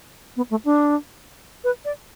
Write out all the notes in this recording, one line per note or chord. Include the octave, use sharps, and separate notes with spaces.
B3
A3
D4
B4
D5